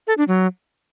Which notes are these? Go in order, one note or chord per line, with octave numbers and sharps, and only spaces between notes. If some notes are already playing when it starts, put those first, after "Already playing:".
A4
D4
F#3